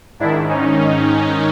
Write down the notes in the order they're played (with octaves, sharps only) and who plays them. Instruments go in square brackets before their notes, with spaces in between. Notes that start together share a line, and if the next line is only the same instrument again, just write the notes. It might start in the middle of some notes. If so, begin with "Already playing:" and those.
[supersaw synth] G#2 D#3 D4 E4
C#4 D#4